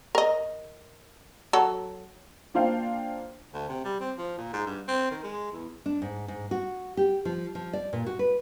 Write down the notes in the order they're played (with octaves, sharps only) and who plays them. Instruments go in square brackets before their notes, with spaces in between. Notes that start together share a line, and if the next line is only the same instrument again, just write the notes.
[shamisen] A#4 D#5
F#3 A4
[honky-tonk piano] A#3 D4 F4 C5 F5 G5
[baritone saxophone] D2
C3
G3
C4
F3
A#2
G#2
G2
C4
D#3
G#3
E2
[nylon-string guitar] D4
G#2
G#2
F#4
G4
F3
F3
D5
A#2
F#4
B4